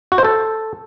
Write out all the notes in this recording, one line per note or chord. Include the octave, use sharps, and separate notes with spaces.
F#4
C5
A4